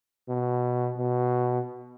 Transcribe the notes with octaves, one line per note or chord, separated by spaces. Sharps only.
B2
B2